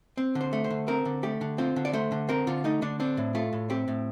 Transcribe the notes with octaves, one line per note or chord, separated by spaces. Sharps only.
C4
D3
C5
A3
C5
D3
C4 A#4
D3
A3 G4
D3
C4 F4
D3
D5
A3 C5
D3
C4 A#4
D3 F4
A3 D#4
D3 D4
C4 D4
A2
A3 F4
A2
C4 G4
A2